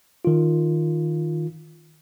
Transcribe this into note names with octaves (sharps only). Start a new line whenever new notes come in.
D#3 F4